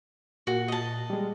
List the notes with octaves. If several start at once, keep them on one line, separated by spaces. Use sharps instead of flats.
A#2 F#4
D#5 A5
G3 G#3